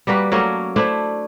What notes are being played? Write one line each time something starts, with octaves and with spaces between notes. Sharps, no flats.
G3 A#3 F#4 B4
F#3 A3 A#3 C#4
A3 D4 E4 C5